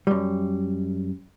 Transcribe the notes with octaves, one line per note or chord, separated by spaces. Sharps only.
F#2 G3